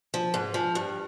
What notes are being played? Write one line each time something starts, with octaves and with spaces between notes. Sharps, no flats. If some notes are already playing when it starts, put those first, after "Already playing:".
F3
G#2
F3
G2